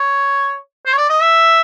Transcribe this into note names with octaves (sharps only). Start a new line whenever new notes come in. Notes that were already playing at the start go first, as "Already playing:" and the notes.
Already playing: C#5
C5
C#5
D5
D#5
E5